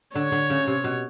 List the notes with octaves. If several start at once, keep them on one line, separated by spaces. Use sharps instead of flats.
D3 C#5
D3
C#3
C3
B2